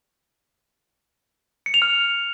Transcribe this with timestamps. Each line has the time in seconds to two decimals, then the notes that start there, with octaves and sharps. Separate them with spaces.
1.66 C#7
1.74 F7
1.82 F6